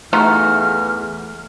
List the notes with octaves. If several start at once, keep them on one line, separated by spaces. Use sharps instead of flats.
E2 A3 D#4 F4 F#4 F6